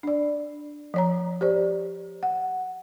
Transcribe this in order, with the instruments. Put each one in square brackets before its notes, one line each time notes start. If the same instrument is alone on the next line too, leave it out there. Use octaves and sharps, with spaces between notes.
[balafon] D4 D5
F3 C#5 A#5
G4 C5 D5
F#5